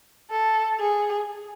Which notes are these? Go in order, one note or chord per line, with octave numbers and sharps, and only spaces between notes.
A4
G#4